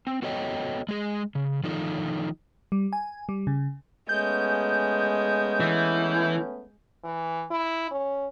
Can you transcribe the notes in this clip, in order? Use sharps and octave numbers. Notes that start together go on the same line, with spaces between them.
C4
B3 F#4 A4 C#5 D#5 G5
G#3 G#4
C#3
D#3 F3 D#4 F4 A4
G3
G#5
G3
C#3
G#3 A3 B3 C#4 G6
E3
E3
E4
C#4